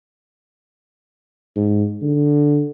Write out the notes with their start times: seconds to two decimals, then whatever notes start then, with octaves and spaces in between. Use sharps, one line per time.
1.56 G#2
2.02 D3